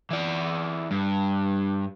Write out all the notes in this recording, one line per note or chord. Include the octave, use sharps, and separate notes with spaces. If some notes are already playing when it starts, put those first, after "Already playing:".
E3 D5
G2